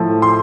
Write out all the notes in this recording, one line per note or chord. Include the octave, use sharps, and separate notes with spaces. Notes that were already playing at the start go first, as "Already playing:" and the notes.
Already playing: A2 F3 A3
C6